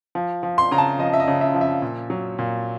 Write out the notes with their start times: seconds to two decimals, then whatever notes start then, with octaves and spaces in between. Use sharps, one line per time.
0.15 F3
0.43 F3
0.58 C6
0.71 C#3 A#5
0.78 A5
0.99 F3 D#5
1.13 E5
1.20 D#5
1.27 C#3
1.41 E5
1.54 F3
1.61 E5
1.82 A#2
2.10 F#3
2.39 A#2